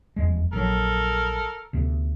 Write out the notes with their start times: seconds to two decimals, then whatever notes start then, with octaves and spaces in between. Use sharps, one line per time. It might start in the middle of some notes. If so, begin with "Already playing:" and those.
0.16 F1 E2 G#3
0.53 A#1 F#3 A4 A#4
1.73 D2 C3 B3